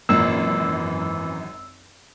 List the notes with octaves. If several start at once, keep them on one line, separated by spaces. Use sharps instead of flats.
G#1 F#2 A#2 E3 E6